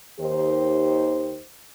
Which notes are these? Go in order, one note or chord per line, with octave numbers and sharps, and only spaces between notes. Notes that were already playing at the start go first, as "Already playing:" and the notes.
D#2 D#3 D#4 G4 C5